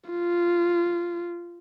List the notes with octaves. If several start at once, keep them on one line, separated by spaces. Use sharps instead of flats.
F4